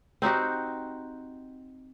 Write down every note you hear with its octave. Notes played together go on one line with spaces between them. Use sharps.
C4 D#4 F#4 G4